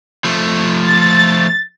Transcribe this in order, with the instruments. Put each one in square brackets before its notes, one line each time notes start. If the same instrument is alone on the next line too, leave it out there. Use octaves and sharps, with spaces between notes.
[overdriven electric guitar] F3 A3
[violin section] A6